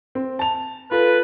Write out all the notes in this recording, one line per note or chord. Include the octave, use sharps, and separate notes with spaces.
C4
A5 F7
F4 A4 B4